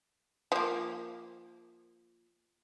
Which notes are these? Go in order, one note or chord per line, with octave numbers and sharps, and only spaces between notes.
F3 A#3